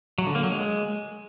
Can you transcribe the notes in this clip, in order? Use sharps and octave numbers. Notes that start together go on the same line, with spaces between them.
F#3
D3
A#3
F#3
G#3